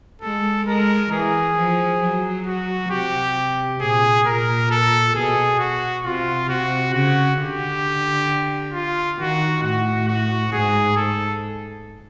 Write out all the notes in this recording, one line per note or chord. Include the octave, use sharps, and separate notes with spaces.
G#3 A4
G#3 A#4
E3 G#4
F3
F#3
F#4
C3 G4
A#2 G#4
A#2 A#4
A4
B2 G#4
F#4
C3 F4
C3 F#4
C#3 F#4
D3 G4
F4
D#3 F#4
A2 F#4
F#4
G#2 G#4
A4